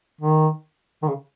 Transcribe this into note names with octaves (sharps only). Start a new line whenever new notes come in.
D#3
D#3
C#3